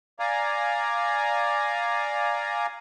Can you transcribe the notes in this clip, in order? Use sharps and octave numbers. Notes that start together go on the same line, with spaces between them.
D5 F5 G#5 A#5